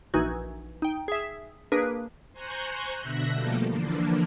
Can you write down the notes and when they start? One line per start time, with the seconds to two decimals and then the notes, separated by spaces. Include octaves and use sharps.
0.14 A#1 E3 D#4 F#4 G#6
0.82 D#4 G5
1.08 G#4 E5
1.72 A#3 D4 G#4 A#4 B4
2.33 C5 G#5 A#5 C#6 F#6 G6
3.00 B2 D3 E5 F#6 A#6
3.32 B2 F3 G3 A3 A#3 A4
3.69 D3 E3 F3 A#3 D4